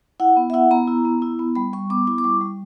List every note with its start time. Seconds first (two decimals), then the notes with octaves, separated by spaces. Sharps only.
0.20 E4 F#5
0.37 B3
0.50 E5
0.54 E4 F#5
0.71 B3 A#5
0.88 E4
1.05 B3
1.22 E4
1.39 B3
1.56 G3 B5
1.73 G3 C#6
1.90 B3 D6
2.07 E4 D6
2.18 D6
2.24 G3 C#6
2.41 G3